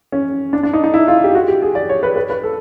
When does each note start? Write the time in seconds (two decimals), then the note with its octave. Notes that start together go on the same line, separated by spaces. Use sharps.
0.12 C#4
0.53 D4
0.63 D4
0.73 D#4
0.84 D#4
0.94 E4
1.08 F4
1.24 G4
1.35 F#4
1.48 G4
1.62 G#4
1.75 D5
1.89 C#5
2.03 B4
2.16 B4
2.30 B4
2.43 A4